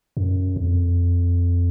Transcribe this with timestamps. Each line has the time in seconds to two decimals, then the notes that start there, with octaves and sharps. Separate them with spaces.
0.17 F#2
0.56 F2